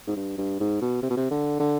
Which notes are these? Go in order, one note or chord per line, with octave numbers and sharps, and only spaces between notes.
G#2
G2
G2
G#2
B2
C3
B2
C3
D3
D3